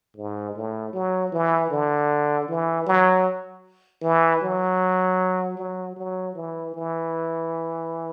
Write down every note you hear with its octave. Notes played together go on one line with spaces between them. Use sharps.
G#2
A2
F#3
E3
D3
E3
F#3
E3
F#3
F#3
F#3
E3
E3